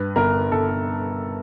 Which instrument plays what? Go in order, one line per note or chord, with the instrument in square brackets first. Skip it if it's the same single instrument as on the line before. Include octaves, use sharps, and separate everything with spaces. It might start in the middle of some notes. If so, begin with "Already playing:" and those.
Already playing: [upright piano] G2 B4
G1 A#4
G1 A4